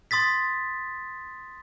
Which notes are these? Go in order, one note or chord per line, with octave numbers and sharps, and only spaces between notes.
C6 D#6 A6 B6